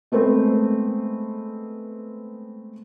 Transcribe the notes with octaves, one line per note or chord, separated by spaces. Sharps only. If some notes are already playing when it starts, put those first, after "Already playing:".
G#3 A3 B3 C4